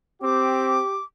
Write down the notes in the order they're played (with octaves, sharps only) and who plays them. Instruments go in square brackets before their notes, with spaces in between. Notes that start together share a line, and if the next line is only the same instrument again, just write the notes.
[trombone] C4 [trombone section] G4 [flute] D6